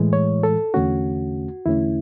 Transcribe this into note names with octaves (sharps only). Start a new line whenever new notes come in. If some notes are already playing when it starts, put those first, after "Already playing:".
Already playing: A2 E3 G#3
C#5
A4
E2 D3 A3 C#4 F#4
E2 D3 A3 C#4 E4